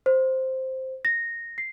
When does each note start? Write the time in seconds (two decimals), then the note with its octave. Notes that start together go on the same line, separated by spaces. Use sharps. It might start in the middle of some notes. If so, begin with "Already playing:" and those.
0.06 C5
1.05 A#6
1.58 C7